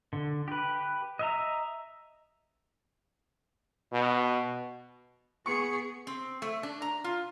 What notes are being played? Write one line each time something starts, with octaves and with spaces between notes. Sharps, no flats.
D3
G4 B4
D#5 E5 A#5
B2
B3 G#4 C#6 C#7
C4
A3
D4
A#5
F4